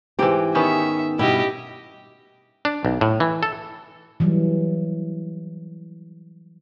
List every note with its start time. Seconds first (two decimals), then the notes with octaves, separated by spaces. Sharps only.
0.19 G#2 E3 C4 G4
0.55 D#3 B3 C#4 E5
1.19 G2 B2 E4 G4 D#5
2.65 D4
2.85 B1
3.01 A2
3.20 E3
3.43 A4
4.20 E3 F#3 G3